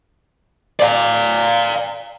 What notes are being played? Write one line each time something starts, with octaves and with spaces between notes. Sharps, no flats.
D5 F5